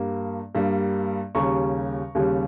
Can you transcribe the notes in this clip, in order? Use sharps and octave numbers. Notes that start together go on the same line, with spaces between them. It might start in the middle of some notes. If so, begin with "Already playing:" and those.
Already playing: G2 G3 A#3
G2 G3 A#3
D#2 C#3 G3 A#5 C#6
D#2 C#3 G3